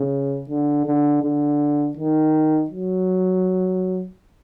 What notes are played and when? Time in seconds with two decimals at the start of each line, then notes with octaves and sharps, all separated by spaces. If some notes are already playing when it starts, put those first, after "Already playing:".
Already playing: C#3
0.49 D3
0.86 D3
1.23 D3
1.97 D#3
2.70 F#3